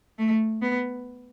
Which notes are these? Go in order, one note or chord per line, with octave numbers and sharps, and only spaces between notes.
A3
B3